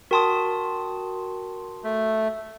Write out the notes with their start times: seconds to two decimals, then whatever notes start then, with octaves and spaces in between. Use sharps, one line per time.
0.11 F#4 A#4 G5 A5 C6 D#6
1.84 A3